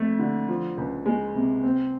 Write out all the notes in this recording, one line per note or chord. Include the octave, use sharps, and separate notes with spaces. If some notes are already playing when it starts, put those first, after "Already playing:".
Already playing: F2 A3
D3
F3
C#2
G#3
C3
C4